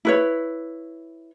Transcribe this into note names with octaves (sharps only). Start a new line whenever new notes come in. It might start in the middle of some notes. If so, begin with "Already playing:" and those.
E4 B4 C#5